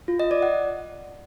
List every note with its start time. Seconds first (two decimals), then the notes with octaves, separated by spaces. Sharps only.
0.08 F4
0.20 D#5
0.31 D5
0.42 F#5